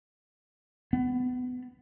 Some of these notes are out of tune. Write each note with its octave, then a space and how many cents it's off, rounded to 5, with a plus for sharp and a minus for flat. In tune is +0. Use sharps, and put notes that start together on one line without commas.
B3 +20